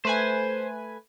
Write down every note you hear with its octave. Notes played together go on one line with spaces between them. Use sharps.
A3 B4 C5 G#5